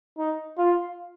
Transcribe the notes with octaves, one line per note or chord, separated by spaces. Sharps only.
D#4
F4